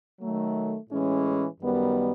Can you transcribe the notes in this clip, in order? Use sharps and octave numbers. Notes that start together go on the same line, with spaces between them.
D#3 F#3 A3
A2 E3 G#3 C#4
F#2 D#3 G3 B3